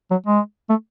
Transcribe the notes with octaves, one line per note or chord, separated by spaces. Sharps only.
F#3
G#3
A3